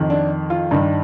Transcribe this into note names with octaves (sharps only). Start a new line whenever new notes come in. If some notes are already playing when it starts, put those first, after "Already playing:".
Already playing: F2 D#3
D4
F4
G2 D#3 D4